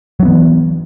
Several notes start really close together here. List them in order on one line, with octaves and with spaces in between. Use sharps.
F#3 D4 B3 E3